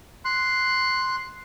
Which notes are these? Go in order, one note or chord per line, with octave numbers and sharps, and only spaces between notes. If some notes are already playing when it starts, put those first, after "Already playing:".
C6 F#6